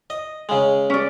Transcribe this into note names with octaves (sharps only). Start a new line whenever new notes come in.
D#5
C#3 G#3
C#4 D5